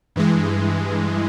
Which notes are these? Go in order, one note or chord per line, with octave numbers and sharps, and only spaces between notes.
G2 E3 G#3